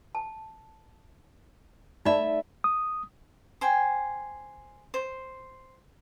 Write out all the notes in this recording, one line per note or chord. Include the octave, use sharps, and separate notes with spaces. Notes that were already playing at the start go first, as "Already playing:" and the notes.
A5
A3 D#4 D5 E5 B5
D#6
C5 G5 G#5
C5